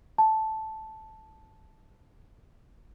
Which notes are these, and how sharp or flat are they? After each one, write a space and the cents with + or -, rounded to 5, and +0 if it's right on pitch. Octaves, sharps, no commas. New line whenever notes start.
A5 -5